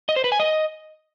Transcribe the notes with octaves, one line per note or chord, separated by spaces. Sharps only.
D#5
C5
B4
G#5
D#5